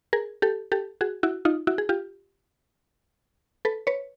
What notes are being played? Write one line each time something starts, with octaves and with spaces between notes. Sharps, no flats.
G#4 A#4
G4 A4
G4 A4
F#4 G#4
E4 F#4
D#4 F4
E4 F#4
G#4
F4 G4
A4 B4
B4 C#5